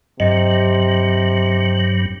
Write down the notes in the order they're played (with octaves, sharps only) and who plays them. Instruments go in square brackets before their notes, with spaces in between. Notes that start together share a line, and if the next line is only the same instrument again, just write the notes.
[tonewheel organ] G2 F#3 [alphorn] C3 [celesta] D#5